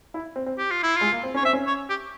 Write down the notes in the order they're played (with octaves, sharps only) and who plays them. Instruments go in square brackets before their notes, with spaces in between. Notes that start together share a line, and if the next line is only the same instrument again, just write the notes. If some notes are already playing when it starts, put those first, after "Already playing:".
[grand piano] E4
C4
C4
[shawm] G4
F4
E4
[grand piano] G#3 [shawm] F4
[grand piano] A#3
C4
[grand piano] C#4 [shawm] C#5
[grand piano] C4 [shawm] E5
[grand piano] C#4
[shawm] C#5
G4